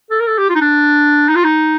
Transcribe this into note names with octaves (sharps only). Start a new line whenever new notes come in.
A4
A#4
A4
G4
F4
D#4
D4
D#4
F4
D#4